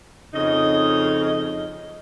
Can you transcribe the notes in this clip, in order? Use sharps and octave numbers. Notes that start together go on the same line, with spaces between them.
F2 C#3 C#4 D#4 D#5